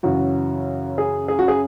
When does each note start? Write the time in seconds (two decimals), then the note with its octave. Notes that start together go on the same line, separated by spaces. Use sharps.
0.03 F#2 C#3 E3 F#4
0.98 G#4
1.28 G#4
1.39 F#4
1.48 G#4